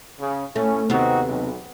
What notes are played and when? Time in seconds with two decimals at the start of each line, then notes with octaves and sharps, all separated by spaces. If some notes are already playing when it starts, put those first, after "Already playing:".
0.20 C#3
0.56 A2 A3 C#4
0.90 D#2 C3 B3 C4 D#4 F#4
1.27 B1